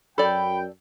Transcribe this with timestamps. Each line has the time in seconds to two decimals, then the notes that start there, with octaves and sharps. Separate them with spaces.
0.18 F#2 A4 D5 G5 B5